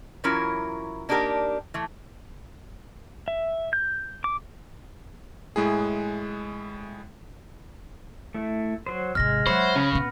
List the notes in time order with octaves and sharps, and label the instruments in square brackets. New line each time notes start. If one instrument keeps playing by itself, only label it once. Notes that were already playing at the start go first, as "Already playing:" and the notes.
[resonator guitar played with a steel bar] E3 F#3 C#4 E4 F4 A#4
A#3 D4 D#4 G4 A#4
E3 A3
[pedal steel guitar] E5
G6
D6
[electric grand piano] A2 G#3 E4 G#4
[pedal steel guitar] A3 E4
F#3 C5
[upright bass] G#1 C3 [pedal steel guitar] G#3 [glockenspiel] F6 A#6
[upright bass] F#3 G#3 [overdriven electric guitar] C5 [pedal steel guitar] C#5 E5 F#5 [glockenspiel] B5
[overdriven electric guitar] C#3 [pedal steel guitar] C#4
[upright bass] A#2 C#4 [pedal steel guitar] B3